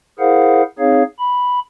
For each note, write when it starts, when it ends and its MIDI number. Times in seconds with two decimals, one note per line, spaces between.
0.19 0.62 64
0.19 0.62 68
0.19 0.62 70
0.19 0.62 72
0.19 0.62 77
0.19 0.62 78
0.79 1.03 60
0.79 1.03 63
0.79 1.03 68
0.79 1.03 73
0.79 1.03 77
1.19 1.59 83